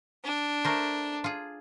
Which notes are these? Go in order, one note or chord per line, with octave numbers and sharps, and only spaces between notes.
D4
A3 A#4 C5
F4 G#4